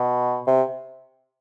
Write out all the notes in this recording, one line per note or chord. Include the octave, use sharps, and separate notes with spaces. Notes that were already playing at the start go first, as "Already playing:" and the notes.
Already playing: B2
C3